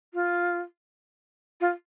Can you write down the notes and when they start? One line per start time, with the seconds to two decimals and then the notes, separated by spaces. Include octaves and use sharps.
0.14 F4
1.61 F4